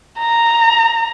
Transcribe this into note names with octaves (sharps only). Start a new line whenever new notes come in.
A#5